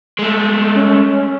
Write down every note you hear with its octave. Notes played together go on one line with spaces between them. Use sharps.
G#3 A3
C#4